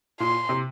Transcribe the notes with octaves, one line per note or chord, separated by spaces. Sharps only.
A#2 C6
C3